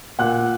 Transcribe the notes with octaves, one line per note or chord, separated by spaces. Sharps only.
A#2 F#5 F#6